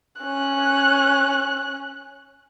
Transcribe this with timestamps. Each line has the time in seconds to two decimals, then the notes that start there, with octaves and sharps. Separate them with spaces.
0.21 C#4 F#6